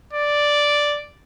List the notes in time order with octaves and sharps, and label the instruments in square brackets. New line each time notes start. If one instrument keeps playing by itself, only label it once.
[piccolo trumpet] D5